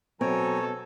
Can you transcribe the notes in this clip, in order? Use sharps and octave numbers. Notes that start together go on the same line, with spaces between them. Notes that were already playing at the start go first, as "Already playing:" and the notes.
B2 F#3 C4 A4 C#5 G#5 A#5